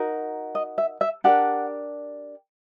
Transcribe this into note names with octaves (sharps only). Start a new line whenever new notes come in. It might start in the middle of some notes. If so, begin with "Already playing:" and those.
Already playing: D#4 F#4 A#4
D#5
E5
E5
D4 G4 A#4 F#5